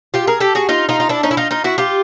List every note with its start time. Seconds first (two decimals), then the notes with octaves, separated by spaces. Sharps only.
0.14 F4 G4
0.27 G#4 A#4
0.40 G4 A4
0.55 F#4 G#4
0.69 D#4 F4
0.89 D#4 F4
1.00 F4
1.09 D4 E4
1.23 C#4 D#4
1.31 E4
1.37 D#4 F4
1.51 D#4 F4
1.64 E4 F#4
1.78 F4 G4